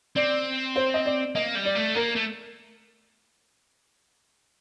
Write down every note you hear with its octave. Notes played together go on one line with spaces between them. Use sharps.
C4 D5
C5
D#5
D5
A#3 D#5
G3
D5
A3
A#3 A#4
A3